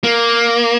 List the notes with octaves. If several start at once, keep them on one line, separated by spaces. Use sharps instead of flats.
A#3